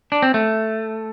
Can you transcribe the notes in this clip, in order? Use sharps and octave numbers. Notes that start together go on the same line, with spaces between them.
D4
C4
A3